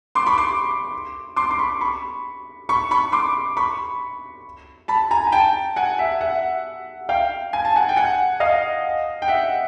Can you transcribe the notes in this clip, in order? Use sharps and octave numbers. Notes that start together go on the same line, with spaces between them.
C6 D6
B5 C#6
C6 D6
C6 D6
C6
B5 C#6
B5 C#6
B5 C#6
B5 C#6
C6 D6
B5 C#6
A5 B5
G#5 A#5
G#5
G5 A5
F#5 G#5
E5 F#5
E5 F#5
F5 G5
G#5
A5
F#5 G#5
G5
F#5 G#5
D#5 F5
G5
E5 F#5